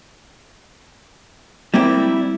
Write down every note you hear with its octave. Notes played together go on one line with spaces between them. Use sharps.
G3 A#3 C4 E4 G4